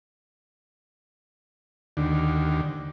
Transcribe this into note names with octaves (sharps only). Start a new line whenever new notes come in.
D#2 D3